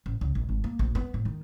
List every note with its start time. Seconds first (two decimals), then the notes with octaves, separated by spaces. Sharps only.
0.06 A1
0.21 C#2
0.35 A#1
0.49 G#1
0.64 A#3
0.79 A#1
0.95 B3
1.14 A2
1.25 D#3